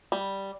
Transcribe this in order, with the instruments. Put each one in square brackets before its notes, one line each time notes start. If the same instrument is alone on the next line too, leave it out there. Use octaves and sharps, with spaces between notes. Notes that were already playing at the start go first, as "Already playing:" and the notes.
[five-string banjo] G3